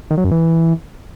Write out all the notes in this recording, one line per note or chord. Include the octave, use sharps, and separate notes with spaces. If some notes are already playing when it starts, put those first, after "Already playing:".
D#3
F#3
F#2
E3